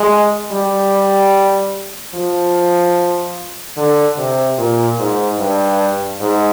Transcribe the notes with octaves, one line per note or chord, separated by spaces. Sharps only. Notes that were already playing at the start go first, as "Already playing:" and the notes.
Already playing: G#3
G3
F3
D3
C3
A#2
G#2
G2
G#2